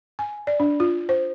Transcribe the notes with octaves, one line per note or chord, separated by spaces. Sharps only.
G#5
D5
D4
F4
C5